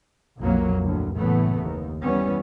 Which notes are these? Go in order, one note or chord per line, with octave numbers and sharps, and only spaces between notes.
B1 F2 A#2 F#3 A#3
D2 A2
F#1 A2 E3 A3 B3
D#2
E3 G3 B3 C#4